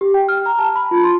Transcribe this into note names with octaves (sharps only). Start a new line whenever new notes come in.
G4
G5
F6
A#5
A5
B5
F4
C6